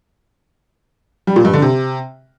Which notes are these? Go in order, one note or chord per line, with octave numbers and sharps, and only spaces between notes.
G3
A#2
G2
D3
C3